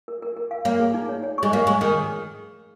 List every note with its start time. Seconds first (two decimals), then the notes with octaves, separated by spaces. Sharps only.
0.08 A#4
0.22 A#4
0.37 A#4
0.51 F5
0.65 A#3 C#5
0.80 G#4
0.94 D#4
1.09 C#5
1.23 C#5
1.38 G#3 C#6
1.53 A#3 C#5
1.67 G#3 C#6
1.81 D#3 G#4